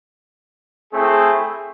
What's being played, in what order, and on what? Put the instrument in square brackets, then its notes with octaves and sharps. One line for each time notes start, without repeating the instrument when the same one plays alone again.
[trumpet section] A3 C4 E4 G#4